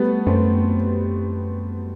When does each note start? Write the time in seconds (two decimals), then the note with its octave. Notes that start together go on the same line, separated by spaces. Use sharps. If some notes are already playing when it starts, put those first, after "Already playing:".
Already playing: G3 A3 B3
0.27 F#2 A3 C4